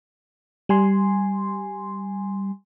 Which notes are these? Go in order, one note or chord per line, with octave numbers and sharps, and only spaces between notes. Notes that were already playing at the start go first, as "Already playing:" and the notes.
G3 G#5 C6